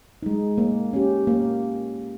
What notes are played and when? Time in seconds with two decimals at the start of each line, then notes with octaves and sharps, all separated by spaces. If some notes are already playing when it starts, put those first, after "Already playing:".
0.23 G#3 D#4
0.58 A#3
0.93 C#4 G4
1.27 A#3